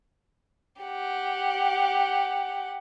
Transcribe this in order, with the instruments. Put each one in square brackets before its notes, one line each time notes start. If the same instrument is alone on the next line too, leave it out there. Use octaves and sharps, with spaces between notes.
[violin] G4 F#5